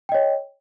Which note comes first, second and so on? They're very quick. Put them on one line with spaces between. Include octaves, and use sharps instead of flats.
G5 D#5 C#5